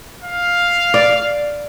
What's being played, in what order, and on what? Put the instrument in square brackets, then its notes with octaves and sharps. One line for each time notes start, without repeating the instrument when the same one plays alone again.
[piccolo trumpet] F5
[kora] D5